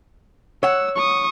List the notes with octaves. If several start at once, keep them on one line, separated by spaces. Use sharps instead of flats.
C#5 F#5 E6
C#6 D#6